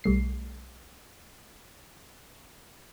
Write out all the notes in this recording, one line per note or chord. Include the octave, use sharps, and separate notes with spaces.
B1 G3 A3 C7